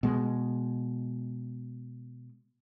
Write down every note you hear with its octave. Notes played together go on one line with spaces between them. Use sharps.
B2 G#3